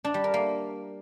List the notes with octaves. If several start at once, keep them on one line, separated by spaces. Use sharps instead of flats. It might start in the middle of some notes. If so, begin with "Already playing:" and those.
D4
G3
A#4
A#3